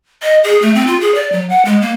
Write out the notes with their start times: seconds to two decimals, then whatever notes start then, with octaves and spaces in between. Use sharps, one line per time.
0.23 D#5
0.44 G#4
0.62 A3
0.75 C4
0.87 F4
1.00 G#4
1.15 D5
1.32 F#3
1.49 F#5
1.65 G#3
1.81 A#3